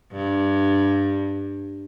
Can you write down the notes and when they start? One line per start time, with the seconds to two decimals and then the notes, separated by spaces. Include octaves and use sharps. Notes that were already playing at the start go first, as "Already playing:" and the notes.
0.12 G2